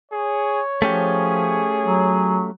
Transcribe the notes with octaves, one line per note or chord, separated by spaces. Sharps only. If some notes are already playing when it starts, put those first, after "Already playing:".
G#4 C#5
F3 A3 C#4 G4 G#4
F#3